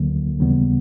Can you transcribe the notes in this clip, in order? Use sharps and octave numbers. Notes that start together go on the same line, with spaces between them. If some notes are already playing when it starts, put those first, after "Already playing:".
Already playing: D2 D3 F#3 A#3
D#2 C#3 E3 G3 B3